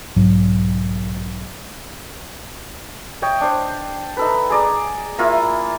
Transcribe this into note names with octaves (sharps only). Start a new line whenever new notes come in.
B1 G#2 F#3
C#5 D#5 G5
D4 C5
D#4 A4 B4
G#4 D5 A#5
A#3 E4 F4 A#5